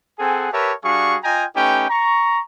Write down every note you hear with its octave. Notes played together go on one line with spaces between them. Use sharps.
C4 G#4 A4 F#5 G#5
G4 A#4 B4 C#5 E5 A5
G3 D4 F#4 G#4 F5 C#6
F4 D#5 G5 G#5 A#5
A3 C#4 D#4 G4 B4 G5
A#5 C#6